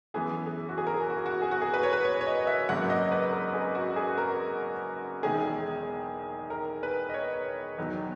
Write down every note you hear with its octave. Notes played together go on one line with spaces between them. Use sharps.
F#2 E3 B3 G#4
G#4
F#4
G#4
A#4
G#4
F#4
F#4
G#4
F#4
G#4
B4
C#5
B4
C#5
C#5
D#5
E5
G#1 F#2 C#3 F#3 A#3 F#5
D#5
B4
A#4
G#4
F#4
G#4
A#4
E1 E2 D#3 G#3 G#4
A#4
B4
D#5
C#5
E2 D#3 F#3 B3